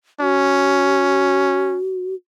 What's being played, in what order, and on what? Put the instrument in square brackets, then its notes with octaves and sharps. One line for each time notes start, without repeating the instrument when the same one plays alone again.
[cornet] C#4 [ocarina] F#4